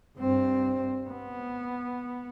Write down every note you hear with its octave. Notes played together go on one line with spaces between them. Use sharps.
G2 C4
B3